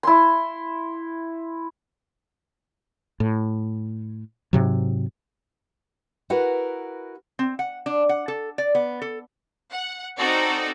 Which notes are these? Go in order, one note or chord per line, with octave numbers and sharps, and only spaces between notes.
E4 C6
A2
G#2 C3 F#3
E4 F#4 A#4 B4 F#5
C4
F#5
D4
F#5
A4
D5
B3
A4
F#5
C4 D#4 F#4 A4 D5